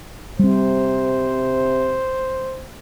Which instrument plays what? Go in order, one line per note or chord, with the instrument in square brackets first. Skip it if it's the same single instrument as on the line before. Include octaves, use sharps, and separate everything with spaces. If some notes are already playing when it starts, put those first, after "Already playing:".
[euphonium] C3 [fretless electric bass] G3 C4 [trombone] C5